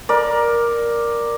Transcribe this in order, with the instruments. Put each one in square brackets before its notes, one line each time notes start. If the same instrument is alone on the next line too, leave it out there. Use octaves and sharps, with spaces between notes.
[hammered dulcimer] A#4 D5